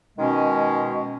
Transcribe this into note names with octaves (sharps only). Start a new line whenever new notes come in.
B2 D#3 G#3 C#4